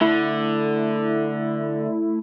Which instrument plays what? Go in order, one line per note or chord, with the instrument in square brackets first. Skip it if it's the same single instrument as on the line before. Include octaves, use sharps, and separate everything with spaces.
[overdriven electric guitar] D3 [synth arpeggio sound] A3 E4